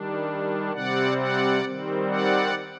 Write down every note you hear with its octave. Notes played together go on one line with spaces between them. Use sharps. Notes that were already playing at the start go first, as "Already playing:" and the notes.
Already playing: D#3 G3 D4
C3 G3 C4 D5 F#5
D5 F#5
D#3 G3 C4
D5 F#5